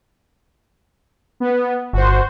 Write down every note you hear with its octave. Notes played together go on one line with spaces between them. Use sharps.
B3
G1 F#4 C5